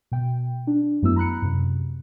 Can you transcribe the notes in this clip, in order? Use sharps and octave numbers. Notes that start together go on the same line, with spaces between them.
B2 G5
D4
F#2 F#3 A3 B3 E4 E6
A#5 B5 F#6 C#7
F#2 C3